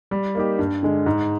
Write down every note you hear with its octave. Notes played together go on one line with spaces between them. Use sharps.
G3
A#3 D#4 G4
G2
D3 G#3
G#2